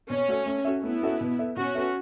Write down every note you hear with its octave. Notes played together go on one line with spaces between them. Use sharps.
B2 C#4
A3 F#4 A4 C#5
A3
C#4 F#4 A4 E5
A3 B3 E4
C#4 F#4 A4 E5
B2
B3 A4 E5
B2 C#4 F#4
B3 A4 E5